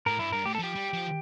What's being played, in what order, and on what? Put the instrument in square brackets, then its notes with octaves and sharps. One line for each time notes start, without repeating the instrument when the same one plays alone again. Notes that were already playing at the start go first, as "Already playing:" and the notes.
[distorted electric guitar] A2 [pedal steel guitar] A#4
[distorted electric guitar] G2 [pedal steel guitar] E4
[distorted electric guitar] G2 [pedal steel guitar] A#4
[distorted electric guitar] A2 [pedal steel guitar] G4
[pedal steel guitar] A4
[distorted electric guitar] F3 [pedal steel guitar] G4
[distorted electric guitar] G3
F3